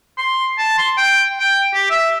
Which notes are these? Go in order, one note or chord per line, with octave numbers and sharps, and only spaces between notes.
C6
A5
C6
G5
G5
G4
E5